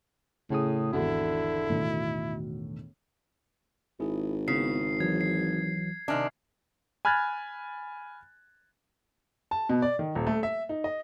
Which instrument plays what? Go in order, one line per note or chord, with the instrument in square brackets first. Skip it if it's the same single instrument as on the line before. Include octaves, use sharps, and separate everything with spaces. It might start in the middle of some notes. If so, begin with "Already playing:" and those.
[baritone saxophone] A2 [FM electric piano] C#3 G#4 D#6
[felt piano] G#1 E2 [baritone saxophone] D3 [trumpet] E4 [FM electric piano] F#4
[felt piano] E1 A2 D#3
[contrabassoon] G#1 [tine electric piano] E4 G#4
[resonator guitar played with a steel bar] C#3 [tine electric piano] B3 E4 [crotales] C7
[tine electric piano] E3 F#3 [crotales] G#6
[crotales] C7
[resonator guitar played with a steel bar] C3 D#3 D4 [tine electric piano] E5 G#5 F6
[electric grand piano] G#5 B5 F6 F#6 G#6 A6
[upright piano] A5
B2
D5
D#3
D#1
A3
E5
D#4
D#5